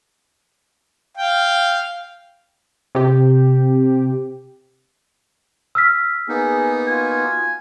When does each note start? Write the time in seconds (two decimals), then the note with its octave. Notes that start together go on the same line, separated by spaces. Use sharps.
1.17 F5 G5
2.95 C3 G4
5.75 E6 F6 B6
6.29 A#3 B3 D#4 G#4
6.87 F4 F#4 G#5